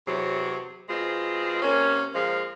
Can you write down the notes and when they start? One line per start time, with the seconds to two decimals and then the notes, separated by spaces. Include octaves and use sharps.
0.07 E2 C3 F#3
0.89 B2 G#3 C4 F4
1.62 C3 A#3 C#4
2.15 A#2 F3 G#3 F5